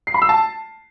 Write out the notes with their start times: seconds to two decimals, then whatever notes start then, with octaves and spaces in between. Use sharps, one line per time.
0.07 C7
0.14 B5
0.22 E6
0.29 A5